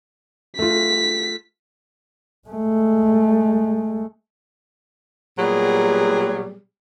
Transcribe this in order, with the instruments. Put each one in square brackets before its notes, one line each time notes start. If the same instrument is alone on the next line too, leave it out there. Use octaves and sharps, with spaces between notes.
[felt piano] A3 F4 [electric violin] B6
[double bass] G#3 A3
[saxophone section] A#2 F#3 G3 B3 G4 G#4